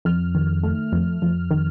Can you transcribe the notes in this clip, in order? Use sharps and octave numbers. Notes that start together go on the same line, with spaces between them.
F2 F6
D#3
A3
F2
F2
D#3